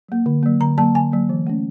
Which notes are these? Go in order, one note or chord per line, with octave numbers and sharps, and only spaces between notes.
F#3 A#3
D3
F#3 A#3
D3 A#5
F#3 A#3 A5
D3 G#5
F#3 A#3
E3
A3 C#4